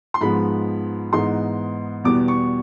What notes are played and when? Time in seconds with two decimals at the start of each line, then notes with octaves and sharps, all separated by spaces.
0.14 C6
0.21 G#2 F3 G#3 B3 B5
1.13 G#2 E3 G#3 B3 D#4 C6
2.04 E2 B2 G3 B3 D6
2.28 C#6